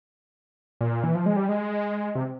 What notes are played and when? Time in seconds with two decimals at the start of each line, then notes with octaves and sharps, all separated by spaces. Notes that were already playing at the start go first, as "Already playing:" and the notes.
0.81 A#2
1.03 E3
1.15 F3
1.26 G#3
1.36 G3
1.49 G#3
2.15 C3